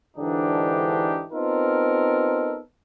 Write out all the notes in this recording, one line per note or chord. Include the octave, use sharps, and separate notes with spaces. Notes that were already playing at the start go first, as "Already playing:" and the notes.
G#2 D3 E3 D4 D#4 G4
B3 C4 D#4 F4 A4 A#4